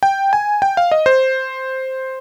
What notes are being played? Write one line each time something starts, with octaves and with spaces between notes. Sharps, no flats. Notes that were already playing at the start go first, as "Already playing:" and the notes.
G5
G#5
G5
F5
D#5
C5